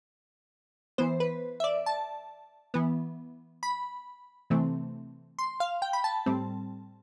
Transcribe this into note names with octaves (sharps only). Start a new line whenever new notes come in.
E3 B3 C5
B4
E5
D5
A5
E3 B3
B5
C3 E3 A3 C4
C6
F5
G5
B5
A5
A2 G3 C4